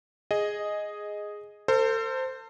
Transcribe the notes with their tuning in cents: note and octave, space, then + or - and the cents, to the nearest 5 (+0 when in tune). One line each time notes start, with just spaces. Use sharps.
G#4 +0 D#5 +0
A4 +40 C5 -5